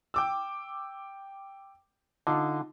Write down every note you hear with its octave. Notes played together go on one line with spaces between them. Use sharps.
G5 D6 E6
D3 D#4 F4